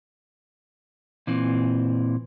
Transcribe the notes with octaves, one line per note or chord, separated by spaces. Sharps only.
A#2 E3 C4